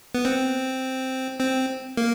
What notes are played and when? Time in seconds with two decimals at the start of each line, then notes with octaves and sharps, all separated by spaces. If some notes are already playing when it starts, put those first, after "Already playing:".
0.15 B3
0.25 C4
1.40 C4
1.97 A#3